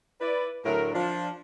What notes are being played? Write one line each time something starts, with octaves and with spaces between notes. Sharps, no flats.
E4 B4 D5
A2 D3 F#3 A3 A#4
F3 D4 F4